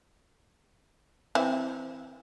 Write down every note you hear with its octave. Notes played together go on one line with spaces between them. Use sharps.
E3 C4